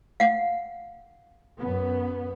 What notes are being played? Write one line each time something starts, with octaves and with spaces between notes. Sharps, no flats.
F5 F#5
F#2 B3